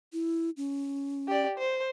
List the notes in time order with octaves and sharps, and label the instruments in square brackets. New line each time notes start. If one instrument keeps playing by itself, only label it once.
[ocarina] E4
C#4
[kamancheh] G4 D5
C5